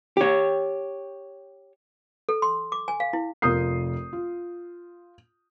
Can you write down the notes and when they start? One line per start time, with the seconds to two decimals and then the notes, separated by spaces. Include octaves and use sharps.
0.17 G4 C#5
2.29 A4
2.42 C6
2.72 D6
2.88 G#5
3.00 F5
3.13 E4
3.42 F1 F4 A#4 D#6 G6 C7
4.13 F4